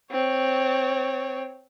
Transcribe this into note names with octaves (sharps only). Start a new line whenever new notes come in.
C4 C#5